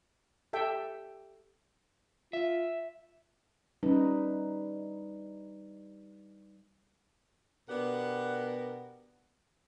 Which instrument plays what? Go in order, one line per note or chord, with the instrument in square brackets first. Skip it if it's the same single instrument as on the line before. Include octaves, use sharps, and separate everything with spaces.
[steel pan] G4 A4 E5 G5
[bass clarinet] F4 [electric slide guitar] E5
[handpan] G3 D#4 B4 [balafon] C#4
[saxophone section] B2 B3 D4 G4 A#4 F#5